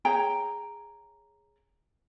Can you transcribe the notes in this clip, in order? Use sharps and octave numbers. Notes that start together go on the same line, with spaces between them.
G#4 C#5 G5 A#5